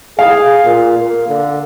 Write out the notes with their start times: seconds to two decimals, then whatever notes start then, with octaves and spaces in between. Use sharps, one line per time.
0.19 G#4 F5
0.64 A#2
0.99 A#3
1.28 D3